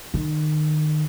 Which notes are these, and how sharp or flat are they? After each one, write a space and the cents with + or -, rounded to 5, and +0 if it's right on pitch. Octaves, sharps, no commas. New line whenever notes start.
D#3 -30